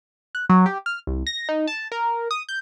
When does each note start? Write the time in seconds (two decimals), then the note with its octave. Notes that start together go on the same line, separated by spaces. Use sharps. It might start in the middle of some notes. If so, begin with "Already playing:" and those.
0.35 F#6
0.49 F#3
0.66 G4
0.86 F6
1.07 C2
1.27 A#6
1.49 D#4
1.67 A5
1.92 A#4
2.31 D#6
2.49 G6